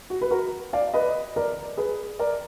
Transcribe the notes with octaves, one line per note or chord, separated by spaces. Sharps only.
F#4
B4
F#4 A#4
D5 F5
B4 D#5
A#4 D5
G#4 B4
A#4 D5